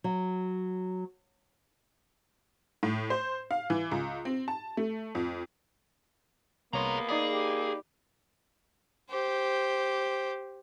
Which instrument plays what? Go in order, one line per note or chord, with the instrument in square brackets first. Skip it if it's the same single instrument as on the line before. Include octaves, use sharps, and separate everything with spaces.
[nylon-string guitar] F#3
[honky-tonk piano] A2
C5
F5
E3
C#2
C4
A5
A3
F2
[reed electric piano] C2 C#5 C6 [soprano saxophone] A#3 [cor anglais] B3 [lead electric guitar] G#4 A#5
[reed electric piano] D#4 D5 B5 [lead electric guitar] G#4
[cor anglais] G4
[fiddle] G4 C5